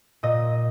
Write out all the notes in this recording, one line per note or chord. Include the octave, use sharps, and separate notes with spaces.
A#2 D#5